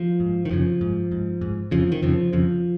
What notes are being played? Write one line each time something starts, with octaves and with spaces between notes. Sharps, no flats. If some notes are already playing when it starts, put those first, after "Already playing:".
Already playing: F3
G#2
D#3
F#2 C#3 F3
G#2
G#2
G#2
F2 C#3 F3
D#3
F2 C#3 F3
F2 C#3 F3